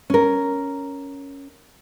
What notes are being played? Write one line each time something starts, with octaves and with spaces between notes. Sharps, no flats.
C#4 A#4